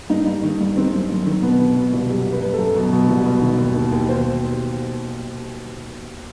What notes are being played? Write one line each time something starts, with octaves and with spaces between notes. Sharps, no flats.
G2 D#4
G2
D#3
G2
D#3 C4
F#2
F#2
D#3
B2 B3
B2
B2
C2
F#2 G4
F#2
B4
F#2
A4
F#2
B2
B2
C2
B2
D#3
D#2
D#2
D#2
B2 C5